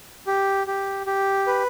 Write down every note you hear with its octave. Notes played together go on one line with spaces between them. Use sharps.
G4
G4
G4
B4